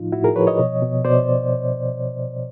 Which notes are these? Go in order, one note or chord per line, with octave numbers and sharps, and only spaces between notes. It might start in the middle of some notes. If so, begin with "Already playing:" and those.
Already playing: A2 F3 D#4 F4
A2 E4 F#4
G#4 A#4
F3 B4 C#5
C#5 D#5
B2
B2
B2 C5 D5